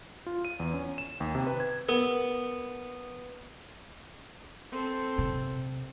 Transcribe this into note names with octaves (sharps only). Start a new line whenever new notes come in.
F4
D#7
E2
C#4
E7
D#2
C3
B4
G#6
B3 A#4
C4 A4
C3